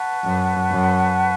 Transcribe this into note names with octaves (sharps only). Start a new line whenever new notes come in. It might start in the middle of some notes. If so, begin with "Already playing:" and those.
Already playing: B4 F#5 A5 C#6
F#2
F#2